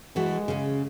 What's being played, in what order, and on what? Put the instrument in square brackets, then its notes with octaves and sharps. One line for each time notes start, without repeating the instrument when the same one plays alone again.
[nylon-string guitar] E3 A3 F#4 [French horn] G#3
[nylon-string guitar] C#3 C#4